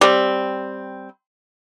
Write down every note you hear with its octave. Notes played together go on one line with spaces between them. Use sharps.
G3 C4